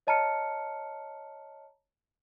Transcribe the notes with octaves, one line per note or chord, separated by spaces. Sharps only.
C#5 D#5 A5 A#5 F6 C#7